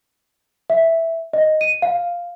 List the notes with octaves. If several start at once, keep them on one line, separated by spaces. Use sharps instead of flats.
E5
D#5
D#7
F5